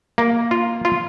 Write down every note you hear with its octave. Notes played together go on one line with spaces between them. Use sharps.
A#3
F4
F4